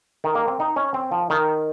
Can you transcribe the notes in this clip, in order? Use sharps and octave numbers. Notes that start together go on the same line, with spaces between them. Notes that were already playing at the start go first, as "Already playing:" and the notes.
D#3
A#3
C4
D#4
C#4
C4
F3
D#3